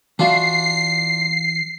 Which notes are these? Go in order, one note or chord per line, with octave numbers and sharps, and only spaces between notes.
E3 D4 F4 F#4 E5 C7